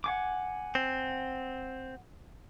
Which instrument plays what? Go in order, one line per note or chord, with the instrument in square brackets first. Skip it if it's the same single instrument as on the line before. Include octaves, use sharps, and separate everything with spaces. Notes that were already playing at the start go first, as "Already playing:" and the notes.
[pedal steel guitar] F#5 G#5 D6
[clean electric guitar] C4